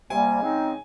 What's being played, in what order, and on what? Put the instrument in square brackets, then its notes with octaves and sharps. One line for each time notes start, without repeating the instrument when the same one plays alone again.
[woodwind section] C3 G3 A#3 [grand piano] G#5
[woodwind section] C#3 G#3 C4 D#4